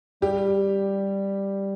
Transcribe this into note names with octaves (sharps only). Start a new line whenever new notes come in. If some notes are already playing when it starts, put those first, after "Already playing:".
G3 G4